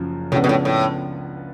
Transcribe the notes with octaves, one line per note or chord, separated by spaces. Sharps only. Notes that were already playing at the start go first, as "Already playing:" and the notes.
Already playing: F#1 F#2 F3
C#2 A2 C#3 F3 B3 D4
B2
A2
A2